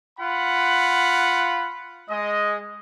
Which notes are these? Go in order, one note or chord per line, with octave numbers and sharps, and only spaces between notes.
F4 F#5 B5
G#3 D#5